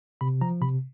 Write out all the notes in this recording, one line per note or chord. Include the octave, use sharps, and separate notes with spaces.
C3 B5
F3 A#5
C3 B5